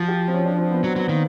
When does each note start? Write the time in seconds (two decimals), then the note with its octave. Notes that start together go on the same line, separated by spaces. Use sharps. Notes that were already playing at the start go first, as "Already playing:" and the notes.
Already playing: F3 F#4
0.08 G4
0.28 C4
0.34 C#4
0.45 D4
0.58 C4
0.71 B3
0.83 F#3 C4
0.96 F#3 B3
1.08 D#3 A#3